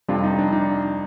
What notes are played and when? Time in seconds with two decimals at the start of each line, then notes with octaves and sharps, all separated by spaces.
0.08 F2 C3 G3 D4 F4
0.24 D#4
0.39 D4
0.53 D#4